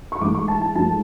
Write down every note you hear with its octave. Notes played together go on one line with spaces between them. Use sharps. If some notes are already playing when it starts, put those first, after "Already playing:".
C#6
G#2 E3 A3 D6
C#6
A5
A5
G#2 F3 A3 A5